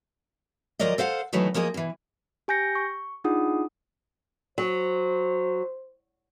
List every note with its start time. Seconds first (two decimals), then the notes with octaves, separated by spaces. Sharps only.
0.79 D2 F3 F#3 A#4 D5 D#5
0.98 A4 C5 F5 F#5
1.33 D#3 E3 F#3 A3 B3 D#4
1.54 F3 A#3 G#4 C#5 D#5
1.74 B2 E3
2.48 G4 G#5 G6 A#6 C#7
2.75 C#6
3.24 D4 D#4 F4 G#4 F#5 D#6
4.58 F#3 C5